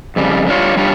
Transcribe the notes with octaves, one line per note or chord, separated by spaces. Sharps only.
F2 C#3 G3
G3 D4 F4 C#5
G3 D4 F4 C#5